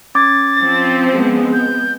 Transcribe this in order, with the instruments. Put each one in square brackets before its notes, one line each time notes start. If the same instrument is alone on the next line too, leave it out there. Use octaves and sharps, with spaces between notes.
[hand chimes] C#4 D6 G#6 [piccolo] A6
[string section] F3 C4
[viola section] G#3 B3
[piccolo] G6